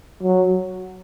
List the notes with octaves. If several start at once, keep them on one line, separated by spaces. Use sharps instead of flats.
F#3